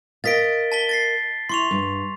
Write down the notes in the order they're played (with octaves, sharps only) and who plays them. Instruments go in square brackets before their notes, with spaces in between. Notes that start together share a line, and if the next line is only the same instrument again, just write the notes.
[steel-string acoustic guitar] A#4 D#5 F5 [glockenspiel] A6 B6 D7
[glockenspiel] A5 B6 G7
A6 A#6 C7
[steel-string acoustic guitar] E4 [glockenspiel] C6 C#6 F7
[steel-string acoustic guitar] G2